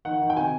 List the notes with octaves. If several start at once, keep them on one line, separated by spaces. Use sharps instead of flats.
D#3 F#5
D#3
G5
C3 G#5